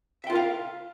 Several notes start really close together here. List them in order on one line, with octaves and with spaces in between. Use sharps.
E5 G5 F4 A#4 F5